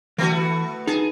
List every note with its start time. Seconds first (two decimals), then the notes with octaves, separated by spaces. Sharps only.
0.18 E3 A3 B3 F#4
0.87 D#4 G#4 A5